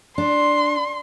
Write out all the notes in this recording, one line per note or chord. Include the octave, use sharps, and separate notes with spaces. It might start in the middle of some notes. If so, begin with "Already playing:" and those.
D4 C6